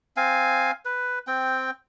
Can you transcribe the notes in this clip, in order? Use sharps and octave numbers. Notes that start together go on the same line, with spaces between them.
C4 F5 G#5
B4
C4 G5